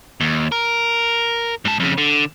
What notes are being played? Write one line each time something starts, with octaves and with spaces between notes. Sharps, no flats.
D#2
A#4
G#2 A5
F2 C#3
D3